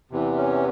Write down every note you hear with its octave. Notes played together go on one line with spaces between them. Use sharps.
E2 C3 E3
C#4